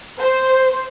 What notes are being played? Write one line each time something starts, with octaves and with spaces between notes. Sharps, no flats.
C5